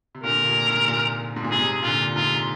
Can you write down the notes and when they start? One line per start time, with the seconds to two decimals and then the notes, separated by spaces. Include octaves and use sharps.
0.15 C3
0.23 A#2 D3 A#4
0.38 C3
0.45 A#2
0.66 G#2 C3
0.88 A#2
1.36 G#2
1.44 A#2
1.51 G#2 C3 G#4
1.83 A#2 D3 F4
2.16 G#2 C3 F4